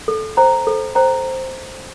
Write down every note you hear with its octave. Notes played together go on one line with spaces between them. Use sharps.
A4
C5 G5 A#5
A4
C5 G5 A#5